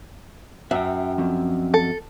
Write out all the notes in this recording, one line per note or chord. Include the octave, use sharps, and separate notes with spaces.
F#2 E5 G5
F3 C4
A4